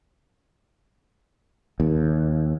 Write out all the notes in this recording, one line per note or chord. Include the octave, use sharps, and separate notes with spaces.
D#2